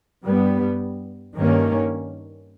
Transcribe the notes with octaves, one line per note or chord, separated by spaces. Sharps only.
G2 G3 B3
G2 D#3 A#3 C#4